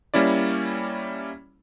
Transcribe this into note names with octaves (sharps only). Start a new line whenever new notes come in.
G3 A#3 C#4 E4 D5